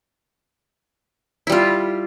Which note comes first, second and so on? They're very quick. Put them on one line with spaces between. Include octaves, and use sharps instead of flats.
E4 G3 F4